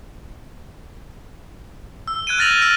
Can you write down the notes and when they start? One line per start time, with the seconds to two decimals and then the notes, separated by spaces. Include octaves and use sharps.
2.08 E6
2.27 F#6 G#6 D7 D#7
2.39 F6 F#6 A6 A#6 F7 F#7
2.62 E6 F6 A#6 D7 D#7